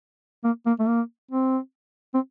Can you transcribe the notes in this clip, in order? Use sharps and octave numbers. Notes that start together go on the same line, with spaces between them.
A#3
A#3
A3
A#3
C4
C4